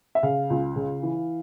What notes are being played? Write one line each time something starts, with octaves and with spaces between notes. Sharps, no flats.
E5
C#3 F5
C#2
C#3
E3